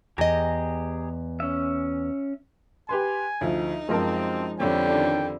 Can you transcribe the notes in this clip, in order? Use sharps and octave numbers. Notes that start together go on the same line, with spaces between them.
E2 G4 G#4 D#5 A#5
C#4 E5
G4 B4 G#5 C6
D2 F3 D#4
F#2 F3 G#3 C4 A#4 A5
F2 D3 G3 C#4 G5
D#3 D4